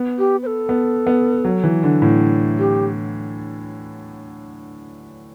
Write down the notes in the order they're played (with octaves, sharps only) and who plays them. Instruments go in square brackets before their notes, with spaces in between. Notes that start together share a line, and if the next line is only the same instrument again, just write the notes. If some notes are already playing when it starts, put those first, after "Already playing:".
Already playing: [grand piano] B3
[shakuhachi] G4
C5
A4
[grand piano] B3
B3
F#3
E3
D3
A2
[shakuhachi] G4